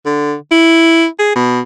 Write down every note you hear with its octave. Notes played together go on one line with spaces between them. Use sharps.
D3
E4
G#4
B2